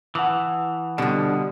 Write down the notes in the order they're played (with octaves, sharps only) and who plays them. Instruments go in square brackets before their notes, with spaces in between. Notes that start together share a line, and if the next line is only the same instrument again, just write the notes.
[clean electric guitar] E3 [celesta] F#5 A5 D#6
[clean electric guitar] B2 [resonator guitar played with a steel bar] D3 F3 [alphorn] G3